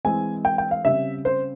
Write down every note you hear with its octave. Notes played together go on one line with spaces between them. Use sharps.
E3 G#3 C4 G#5
G5
G5
F5
C#3 G3 C4 E5
C5